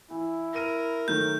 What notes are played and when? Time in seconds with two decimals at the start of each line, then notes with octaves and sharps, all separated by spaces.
0.10 E3 E4
0.53 A#4 A#6 D#7
1.08 D#3 F#3 A3 G6